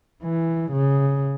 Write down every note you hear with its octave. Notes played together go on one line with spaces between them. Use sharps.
E3
C#3